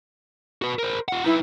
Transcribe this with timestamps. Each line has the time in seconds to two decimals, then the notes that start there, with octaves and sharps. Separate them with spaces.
0.62 F#4 B4
0.79 A#4 C5
1.08 F4 F#5
1.24 D#4 E4 B4